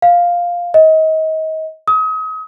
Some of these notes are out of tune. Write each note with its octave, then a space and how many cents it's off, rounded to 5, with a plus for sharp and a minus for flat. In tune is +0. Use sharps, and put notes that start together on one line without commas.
F5 +5
D#5 +30
D#6 +35